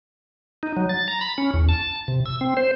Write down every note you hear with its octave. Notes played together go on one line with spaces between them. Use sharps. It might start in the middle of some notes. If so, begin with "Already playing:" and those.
D#4
F#3
A6
A#5
B5
C#4
E2
A5
C3
E6
C4
C5